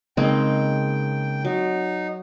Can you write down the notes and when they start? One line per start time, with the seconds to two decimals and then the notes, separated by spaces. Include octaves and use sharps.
0.17 C#3 G#3 A#3 C4 D#4 G5
1.45 F#3 D#4